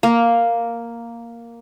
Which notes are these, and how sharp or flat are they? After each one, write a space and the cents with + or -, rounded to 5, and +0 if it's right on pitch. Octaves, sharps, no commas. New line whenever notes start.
A#3 +0 F5 +0